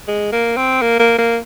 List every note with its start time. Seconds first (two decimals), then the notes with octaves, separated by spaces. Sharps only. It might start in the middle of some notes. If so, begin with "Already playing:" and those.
0.08 G#3
0.33 A#3
0.57 C4
0.82 A#3
0.99 A#3
1.18 A#3